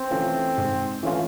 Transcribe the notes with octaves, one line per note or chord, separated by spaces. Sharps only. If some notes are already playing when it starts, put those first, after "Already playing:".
Already playing: C4
E3 A3 C#4 F4
G#2
E3 A3 C#4 F4